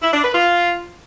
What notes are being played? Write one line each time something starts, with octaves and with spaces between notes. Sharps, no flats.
E4
D4
B4
F4